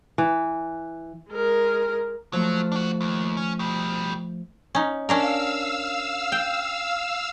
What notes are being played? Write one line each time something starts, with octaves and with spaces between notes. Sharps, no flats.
E3
G#3 A#4
F3 F#3 A3
D4 F#4
D#2
C#4
B2 G3
C#4 D#4
C#4 D4 A#4 F5 E6
G5